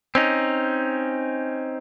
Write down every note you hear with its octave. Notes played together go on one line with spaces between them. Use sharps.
C4 C#4 D#4